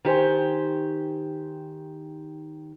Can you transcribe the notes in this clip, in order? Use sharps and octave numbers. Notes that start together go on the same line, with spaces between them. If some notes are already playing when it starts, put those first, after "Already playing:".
D#3 G4 C5 G#5